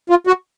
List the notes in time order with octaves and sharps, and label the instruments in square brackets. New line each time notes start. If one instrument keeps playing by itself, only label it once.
[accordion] F4
F#4